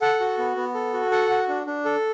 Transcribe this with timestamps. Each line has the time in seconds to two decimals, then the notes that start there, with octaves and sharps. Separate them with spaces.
0.02 A4 F#5
0.20 F#4
0.38 B3
0.56 B3
0.75 A4
0.93 F#4
1.11 A4 F#5
1.30 F#4
1.48 D4
1.67 D4
1.85 A4